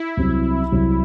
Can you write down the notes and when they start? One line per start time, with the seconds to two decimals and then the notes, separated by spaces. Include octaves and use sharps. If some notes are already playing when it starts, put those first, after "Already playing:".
Already playing: E4
0.17 C2 C3 F#3 C4
0.72 C2 C3 F#3 C4